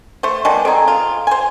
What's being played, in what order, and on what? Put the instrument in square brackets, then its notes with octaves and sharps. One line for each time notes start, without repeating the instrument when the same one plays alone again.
[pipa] A3 C5
[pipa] B2 D#3 G3 [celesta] D#5 G#5 A5
[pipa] C4 G#4 [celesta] A4 D#5 A#5
[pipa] F4
C5 G#5